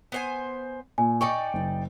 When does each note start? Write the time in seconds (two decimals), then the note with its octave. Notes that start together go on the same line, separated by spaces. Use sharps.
0.12 B3 C5 G#5
0.98 A#2 G#5
1.21 D#4 D5 G5 C#6
1.54 F#1